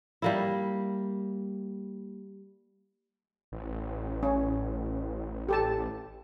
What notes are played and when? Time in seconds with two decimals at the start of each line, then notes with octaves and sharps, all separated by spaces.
0.22 G3 A#3 E4
3.52 A1
4.23 C#4
5.49 G4 A4 A5